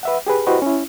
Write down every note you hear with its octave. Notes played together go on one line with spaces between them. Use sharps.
B4 E5 F#5
G4 G#4 B4
E4 F#4 G4 B4 C5 D#5
C#4 E4